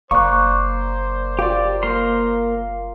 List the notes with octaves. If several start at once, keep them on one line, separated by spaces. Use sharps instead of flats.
F#1 A#3 C5 D5 C#6 F#6
F4 G4 D5
A#3 A#4 C6